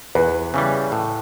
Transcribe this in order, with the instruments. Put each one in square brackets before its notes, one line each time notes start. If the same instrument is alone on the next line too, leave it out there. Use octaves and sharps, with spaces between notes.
[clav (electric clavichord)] E2 [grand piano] B4
[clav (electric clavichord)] C#3 E3 G3
A2